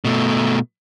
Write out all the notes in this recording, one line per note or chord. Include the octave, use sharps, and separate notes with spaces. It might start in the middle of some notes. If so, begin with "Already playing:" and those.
B2 A3